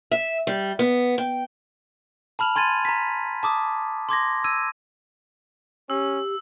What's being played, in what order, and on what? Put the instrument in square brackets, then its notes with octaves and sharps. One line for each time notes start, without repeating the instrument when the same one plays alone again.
[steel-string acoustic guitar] E5
G3
B3
G5
[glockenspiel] A5 B5 F6 F7 F#7
G#5 C6 G#6 A6 D#7
A#5 B6
A5 D6 D#6
C6 D6 G#6 A#6
E6 G#6 D#7
[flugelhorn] C#4 [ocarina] G4 [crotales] E6